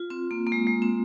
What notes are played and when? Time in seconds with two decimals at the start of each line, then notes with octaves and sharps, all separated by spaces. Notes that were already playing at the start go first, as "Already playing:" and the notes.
Already playing: F4
0.10 C4
0.31 A#3
0.47 A#3
0.52 G#3
0.67 G#3
0.82 C4